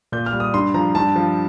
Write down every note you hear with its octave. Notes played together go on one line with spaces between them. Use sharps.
A#2 G6
F6
G3
D#6
G2 C6
F3 A#5
G2 A5
F3